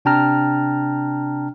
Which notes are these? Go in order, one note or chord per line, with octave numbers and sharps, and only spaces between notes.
C3 D4 G5 A5 A#5 F6